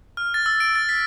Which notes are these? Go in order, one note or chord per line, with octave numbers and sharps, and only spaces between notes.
F6
A6
E6
D7
A6
B6